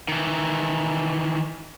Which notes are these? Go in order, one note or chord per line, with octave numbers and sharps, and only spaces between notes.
D#3 E3